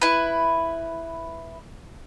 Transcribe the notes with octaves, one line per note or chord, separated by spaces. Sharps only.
E4 B4